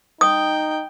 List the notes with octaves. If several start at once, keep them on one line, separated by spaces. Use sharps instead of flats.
D#4 G5 D#6